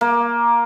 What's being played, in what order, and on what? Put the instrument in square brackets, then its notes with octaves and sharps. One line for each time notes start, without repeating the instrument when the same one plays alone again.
[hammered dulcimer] A#3